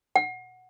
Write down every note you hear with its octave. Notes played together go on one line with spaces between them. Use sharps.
F#5